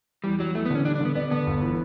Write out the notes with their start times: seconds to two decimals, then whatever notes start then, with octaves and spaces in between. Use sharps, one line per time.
0.24 E2 G3
0.40 F#3 G3
0.55 E2 A3
0.66 B3
0.70 D3 C#4
0.85 G3 D4
0.95 D4
1.01 D3 B3
1.15 B3 D4
1.31 D3 B3
1.47 G1
1.62 E3